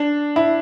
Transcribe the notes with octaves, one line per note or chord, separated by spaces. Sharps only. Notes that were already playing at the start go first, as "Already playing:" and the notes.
Already playing: D4
E4